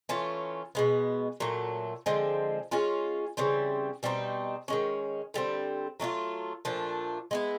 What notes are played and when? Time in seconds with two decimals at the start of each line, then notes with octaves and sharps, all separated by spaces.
0.09 E3 A3 C#4 F4
0.75 B2 G#3 B3
1.40 A#2 F#3 A3
2.06 D3 F3 G#3 C4
2.71 G#3 C#4 F4
3.37 C#3 E3 G3 C4
4.03 B2 G3 C4 D#4
4.68 D#3 G#3 C#4
5.34 D3 G3 C4
6.00 F#3 A3 D4 F4
6.65 A#2 F3 A3 D4
7.31 G#3 B3 E4